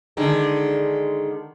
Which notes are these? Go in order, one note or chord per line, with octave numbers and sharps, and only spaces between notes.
D3 D#3 G#3